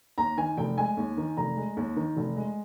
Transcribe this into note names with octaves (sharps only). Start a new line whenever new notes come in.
D#2 A#5
D#3 G#5
F1 G5
G#3 G#5
D#2
D#3
F1 A#5
G#3
D#2
D#3
F1
G#3